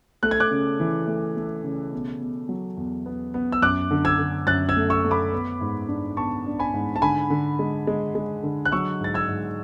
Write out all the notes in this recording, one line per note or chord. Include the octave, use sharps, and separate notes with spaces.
A3 F#6
G#6
D6 F#6
C#3
E3
A3
A3
C#3
B2
B2
F#3
E2
B3
B3
E6
F#2 D6 F#6
D3
E6 G#6
D3
F#2 F#6 A6
E6 G#6
A3
C#6 E6
A3
B5 D6
B3
G#2
D4
B3 A5 C#6
D4
G#5 B5
G#2
A5
D3 G#5 B5
D3
G#3
G#3
G#3
D3
F#6
F#3 C#6 E6
G#2 A6
E6 G#6
G#2